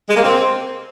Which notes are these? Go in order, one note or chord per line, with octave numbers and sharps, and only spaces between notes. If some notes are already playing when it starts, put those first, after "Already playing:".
G#3
A#3
C4